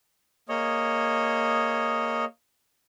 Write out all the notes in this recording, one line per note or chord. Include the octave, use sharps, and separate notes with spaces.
A#3 G#4 C#5 D#5